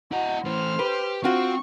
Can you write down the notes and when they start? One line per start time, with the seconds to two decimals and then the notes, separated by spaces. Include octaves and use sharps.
0.12 E4 F#4 D#5
0.45 A2 E3 C5 F6
0.79 G4 B4
1.24 C4 F4 F#4 C#6